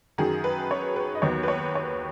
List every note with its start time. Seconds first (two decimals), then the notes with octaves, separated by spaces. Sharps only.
0.18 F#2 D#3 F#3 G#4
0.44 B4
0.71 C#5
0.96 B4
1.15 D#5
1.22 D#2 D#3 F#3 B3 C#5
1.43 B4
1.48 C#5
1.75 C#5